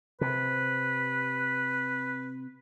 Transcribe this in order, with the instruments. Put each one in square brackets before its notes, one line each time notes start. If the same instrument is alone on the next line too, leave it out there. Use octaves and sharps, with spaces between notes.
[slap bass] C3 [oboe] B4